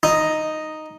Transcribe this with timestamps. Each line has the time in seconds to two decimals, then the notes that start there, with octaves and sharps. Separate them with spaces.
0.03 D#4